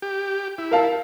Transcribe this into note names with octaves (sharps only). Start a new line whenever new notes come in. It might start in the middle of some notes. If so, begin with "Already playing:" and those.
G4
E4
A#4 F5 A5